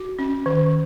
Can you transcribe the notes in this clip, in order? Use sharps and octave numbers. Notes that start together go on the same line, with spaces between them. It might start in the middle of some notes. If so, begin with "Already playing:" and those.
Already playing: F#4
C#4
D#3